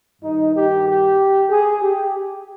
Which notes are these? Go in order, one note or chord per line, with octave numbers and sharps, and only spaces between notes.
G2 D#3 D#4
G4
G4
G#4
G4